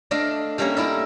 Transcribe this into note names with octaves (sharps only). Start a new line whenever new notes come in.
A3 D4 D5 D#5 F5
G3 A3 A#3 C#4 A#4
D#4 E4 D5 E5